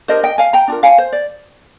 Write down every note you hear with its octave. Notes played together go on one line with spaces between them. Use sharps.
D4 G4 A#4 C5 D#5
D#5 G5
F5 G#5
G5 A#5
D4 F4 A#4
F5 G#5
C5
D5